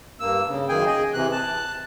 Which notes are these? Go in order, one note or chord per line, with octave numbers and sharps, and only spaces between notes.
G2 A#3 E6
C#3
F#2 D#3 A#3 G#4 G5 G#5
G#4 D#5
C3 E3 F#6
A5 F#6